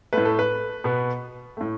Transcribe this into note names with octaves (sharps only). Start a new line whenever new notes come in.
A2 A3 B4
A4
B4
B2 B3
A2 A3